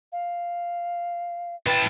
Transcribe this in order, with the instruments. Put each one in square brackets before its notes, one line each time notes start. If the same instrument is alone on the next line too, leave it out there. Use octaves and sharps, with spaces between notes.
[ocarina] F5
[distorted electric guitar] E3 A5 [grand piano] B4 G5 A6